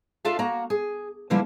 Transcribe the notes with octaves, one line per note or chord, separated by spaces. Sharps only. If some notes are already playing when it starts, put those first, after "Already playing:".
D4 F4 A4 E5 F5
A#3 F#4 A#5
G#4
D3 E3 F3 G3 A#3 E4